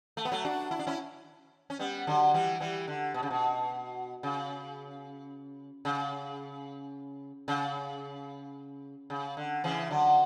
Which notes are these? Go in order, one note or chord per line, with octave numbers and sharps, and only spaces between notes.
A3
B3
F#3 A3
D4 F#4
E4
D4
C#4 E4
C#4
G3 B3
D3 F#3
E3 G3
E3 G3
D3
B2
C#3
B2
C#3
C#3
C#3
C#3
D3
C#3 E3
D3 F#3